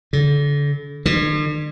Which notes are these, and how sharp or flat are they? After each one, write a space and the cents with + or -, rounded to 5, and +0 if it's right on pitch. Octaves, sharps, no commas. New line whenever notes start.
D3 -35
D3 +45